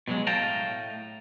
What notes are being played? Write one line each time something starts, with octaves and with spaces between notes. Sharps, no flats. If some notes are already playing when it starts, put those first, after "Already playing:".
B2 D3 F#3 G#3
A2 F5 G5 A5 A#5